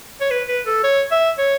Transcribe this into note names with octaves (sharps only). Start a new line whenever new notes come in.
C#5
B4
B4
A4
C#5
E5
C#5